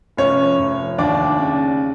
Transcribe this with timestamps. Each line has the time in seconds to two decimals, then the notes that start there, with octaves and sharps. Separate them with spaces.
0.17 F1 C#4 C#5
0.58 F1
0.98 D#2 D4 D5
1.39 C#3